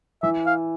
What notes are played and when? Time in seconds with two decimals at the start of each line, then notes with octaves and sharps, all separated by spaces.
0.23 E3 E5
0.46 F5